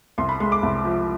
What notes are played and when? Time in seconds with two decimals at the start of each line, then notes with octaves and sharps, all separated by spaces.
0.18 C2 C6
0.29 B5
0.40 G#3 C6
0.52 D6
0.63 C2
0.85 F3